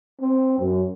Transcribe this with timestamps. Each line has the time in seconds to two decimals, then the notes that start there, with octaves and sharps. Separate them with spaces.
0.21 C4
0.59 F#2